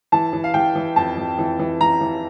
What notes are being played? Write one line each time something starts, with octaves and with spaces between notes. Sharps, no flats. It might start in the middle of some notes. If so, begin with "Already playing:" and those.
E3 A5
E3
F5
E3 G5
E3
F2 A5
F2
E3
E3
E3 A#5
E3